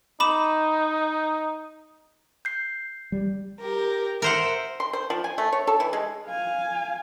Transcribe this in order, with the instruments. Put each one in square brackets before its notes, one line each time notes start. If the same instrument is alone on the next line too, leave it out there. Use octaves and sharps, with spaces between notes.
[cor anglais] D#4 [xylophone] B5 D6 E7
[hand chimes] G6 C7
[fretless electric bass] G3
[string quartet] G4 A#4
[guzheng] A#4 C5 F#5 [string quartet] E5
[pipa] C6
C5
F3
G#5
A3
C#5
A4
E3
G#3
[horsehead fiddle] F5 G#5